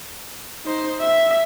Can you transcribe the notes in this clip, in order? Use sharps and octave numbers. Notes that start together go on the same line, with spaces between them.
D#4 C5
E5